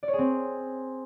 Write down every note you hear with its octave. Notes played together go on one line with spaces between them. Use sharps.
D5
C#5
G#4
C4